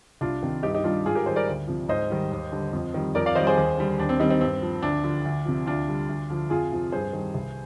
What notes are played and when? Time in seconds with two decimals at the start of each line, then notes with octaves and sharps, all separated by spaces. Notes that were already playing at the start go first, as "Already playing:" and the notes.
0.21 C2 D4 F4
0.43 C3 D#3
0.63 G2 D#4 G4
0.74 D#4 G4
0.84 D#3 G3 D4 F4
1.05 G#2 F4 G#4
1.15 G4 A#4
1.26 D#3 G3 G#4 C5
1.36 A#4 D5
1.47 D2
1.68 C3 F3
1.89 G#2 C5 D#5
2.10 D#3 G3
2.32 D#2
2.52 D3 G3
2.73 F2
2.94 D#3 G3
3.15 F2 A#4 D5
3.26 D5 F5
3.35 D#3 G3 C5 D#5
3.47 G#4 C5
3.57 D#2
3.77 D3 G3
3.98 D#2 D4
4.09 C4
4.20 D#3 G3 C4 D#4
4.30 C4 D#4
4.41 G2 C4
4.62 F3
4.82 D2 D4
5.04 D3 F3
5.25 D2
5.45 C3 F3
5.66 D2 D4 F4
5.88 D3 G3
6.09 D2
6.30 D3 F3
6.50 F2 F4 G#4
6.72 C3 F3
6.92 G2 G#4 C5
7.13 D#3 G3
7.34 C2